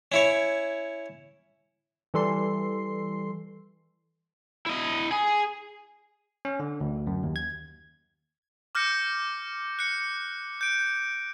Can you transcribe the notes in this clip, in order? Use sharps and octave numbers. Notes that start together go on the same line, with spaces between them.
C#4 E4 C#5
E3 G3 A4 C6 C7
E4 D#5
G#4 G#5
C#4
D3
D2
F#2
D#2
G#6
D6 F6 G6 A#6 C#7
F#6 C#7
G6 D7